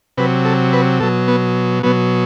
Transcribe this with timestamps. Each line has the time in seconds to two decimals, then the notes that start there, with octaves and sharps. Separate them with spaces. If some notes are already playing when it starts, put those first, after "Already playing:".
0.17 C3 F#3 B4
0.45 A4
0.73 B4
1.00 B2 F#3 A4
1.28 B3
1.83 B2 F#3 B3